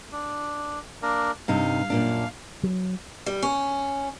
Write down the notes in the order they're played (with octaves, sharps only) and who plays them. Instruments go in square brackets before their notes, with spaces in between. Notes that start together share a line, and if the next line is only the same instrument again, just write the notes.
[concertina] D4
A#3 D4 A#4
[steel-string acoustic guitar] G2 C3 D#4 [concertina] F5
[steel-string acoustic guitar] F#2 A#2 D4
[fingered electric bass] F#3
[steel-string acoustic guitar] G3
C#4